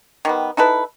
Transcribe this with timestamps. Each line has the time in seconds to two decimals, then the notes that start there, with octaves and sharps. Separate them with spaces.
0.25 D#3 G3 B3
0.57 D#4 E4 A4 B4